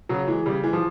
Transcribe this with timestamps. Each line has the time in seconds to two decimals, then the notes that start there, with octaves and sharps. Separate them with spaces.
0.09 C#3 F#3
0.28 E3 G#3
0.46 C#3 G3
0.64 E3 G#3
0.73 F3